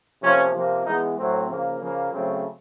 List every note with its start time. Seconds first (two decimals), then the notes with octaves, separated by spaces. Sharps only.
0.23 C3 F3 A#3 C#4
0.55 C3 F3 A#3
0.86 E3 G#3 B3 D#4
1.18 A2 F#3 A3 C4
1.50 C#3 F3 A#3
1.81 C#3 F3 A#3
2.13 C#3 F#3 A3 C4